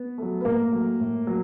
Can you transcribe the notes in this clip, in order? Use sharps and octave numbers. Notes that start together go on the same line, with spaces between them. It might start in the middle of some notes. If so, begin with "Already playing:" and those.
Already playing: B3
F#3 A3
B4
A2 A#3 A#4
F#3 A3
A2
F#3